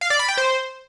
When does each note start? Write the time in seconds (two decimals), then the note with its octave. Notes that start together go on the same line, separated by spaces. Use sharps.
0.01 F5
0.10 D5
0.19 B5
0.28 G5
0.37 C5